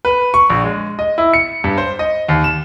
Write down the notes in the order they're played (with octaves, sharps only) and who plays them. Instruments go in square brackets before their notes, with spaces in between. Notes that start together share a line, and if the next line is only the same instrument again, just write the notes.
[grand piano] B4
C#6
A#1
G#3
D#5
E4
C#7
G2
C5
D#5
D#2
E7